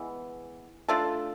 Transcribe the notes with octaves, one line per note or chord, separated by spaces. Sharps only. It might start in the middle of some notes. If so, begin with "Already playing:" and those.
Already playing: E3 G#3 B3
A3 D4 F4 A4